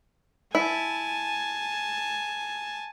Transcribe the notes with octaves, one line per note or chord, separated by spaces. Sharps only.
E4 G#5 A5